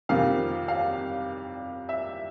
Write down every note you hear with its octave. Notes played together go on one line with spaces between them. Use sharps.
F2 C3 D#3 F5
F5
E5